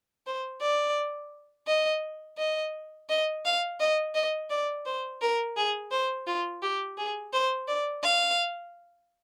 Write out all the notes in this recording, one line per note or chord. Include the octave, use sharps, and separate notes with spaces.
C5
D5
D#5
D#5
D#5
F5
D#5
D#5
D5
C5
A#4
G#4
C5
F4
G4
G#4
C5
D5
F5